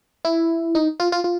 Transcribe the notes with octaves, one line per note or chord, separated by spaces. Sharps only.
E4
D#4
F4
F4
F4